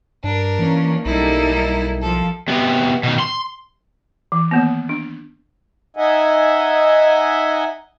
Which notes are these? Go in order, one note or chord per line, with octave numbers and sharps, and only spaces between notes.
G2 D4 A#4
E3 A#3 C#4
B1 G3 A#3 D#4 E4 A4
F3 A4
C3 B3
B2 D#3
C6
E3
D#3 A#3 B3
D4
D#4 D#5 E5 F#5 G#5